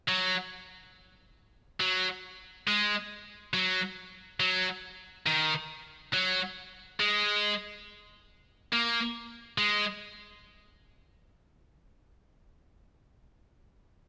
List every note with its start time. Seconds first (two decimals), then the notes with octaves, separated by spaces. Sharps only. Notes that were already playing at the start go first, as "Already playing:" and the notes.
0.08 F#3
1.80 F#3
2.68 G#3
3.54 F#3
4.40 F#3
5.27 D#3
6.14 F#3
7.00 G#3
8.73 A#3
9.58 G#3